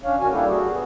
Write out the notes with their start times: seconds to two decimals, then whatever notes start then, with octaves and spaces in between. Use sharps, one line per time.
0.04 C#4 D4 C#5 F5
0.19 D#3 C#4 F#4 G#5
0.32 G3 A#3 D4 E4 G4 A4
0.48 F#4 G#4
0.69 B3